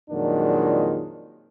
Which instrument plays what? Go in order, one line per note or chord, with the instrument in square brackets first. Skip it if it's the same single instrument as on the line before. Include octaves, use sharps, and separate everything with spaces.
[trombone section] F2 A#2 D#3 F#3 G#3 D4